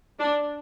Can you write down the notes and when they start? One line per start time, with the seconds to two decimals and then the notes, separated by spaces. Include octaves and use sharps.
0.20 D4